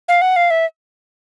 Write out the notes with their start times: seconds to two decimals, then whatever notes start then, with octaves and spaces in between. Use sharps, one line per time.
0.08 F5
0.22 F#5
0.36 F5
0.51 E5